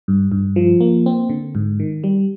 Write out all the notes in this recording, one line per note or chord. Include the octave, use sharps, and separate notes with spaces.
G2
G2
F3
A#3
C4
D3
G#2
D#3
G3